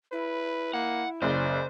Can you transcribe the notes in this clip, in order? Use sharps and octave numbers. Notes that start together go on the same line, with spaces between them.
E4 B4
A#3 F#5
F#1 C#3 C5 D5